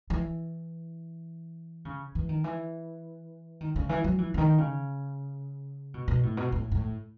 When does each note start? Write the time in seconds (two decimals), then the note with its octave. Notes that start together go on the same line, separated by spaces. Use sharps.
0.10 E3
1.85 C#3
2.15 E3
2.29 D#3
2.44 E3
3.61 D#3
3.76 C#3
3.89 E3
4.04 F#3
4.18 E3
4.34 C#3
4.38 D#3
4.58 C#3
5.94 B2
6.08 B2
6.23 A2
6.37 B2
6.52 A2
6.72 A2